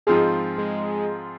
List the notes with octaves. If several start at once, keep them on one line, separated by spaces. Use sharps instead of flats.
G#2 F3 G#3 C4 F4 G#4
G#3